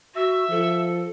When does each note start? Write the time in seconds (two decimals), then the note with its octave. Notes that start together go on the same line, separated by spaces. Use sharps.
0.15 F#4 E5
0.50 F3 A4